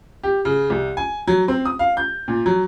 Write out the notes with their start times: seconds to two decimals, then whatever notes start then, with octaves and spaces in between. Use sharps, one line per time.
0.23 G4
0.45 C#3
0.70 C2
0.97 G#5
1.28 F#3
1.48 C4
1.65 D#6
1.79 F5
1.97 G6
2.28 A#2
2.46 F#3